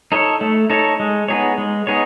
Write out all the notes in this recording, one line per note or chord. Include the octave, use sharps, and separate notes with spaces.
D#4 A4 C#5
A3
D#4 A4 C#5
G#3
B3 D#4 G#4 C#5
G#3
B3 D#4 G#4 C#5